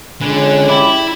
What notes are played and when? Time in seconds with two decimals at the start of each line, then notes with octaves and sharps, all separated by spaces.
0.21 F2 D3 G#3 C#4 B4 G#5
0.68 E4 G4 D5 B5